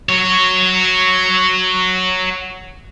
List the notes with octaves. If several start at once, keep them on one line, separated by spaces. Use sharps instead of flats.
F#4 C#5